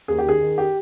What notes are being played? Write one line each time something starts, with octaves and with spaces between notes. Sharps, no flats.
D#2 G#4
G4
D#3 G#4
D#3
G4